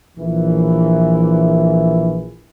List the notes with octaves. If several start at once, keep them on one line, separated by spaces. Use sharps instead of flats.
A#1 E3